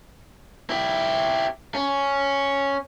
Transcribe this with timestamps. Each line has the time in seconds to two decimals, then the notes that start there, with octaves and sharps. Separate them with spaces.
0.70 E4 G4
1.75 C#4